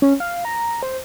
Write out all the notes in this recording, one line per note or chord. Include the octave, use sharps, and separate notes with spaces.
C#4
F5
A#5
C5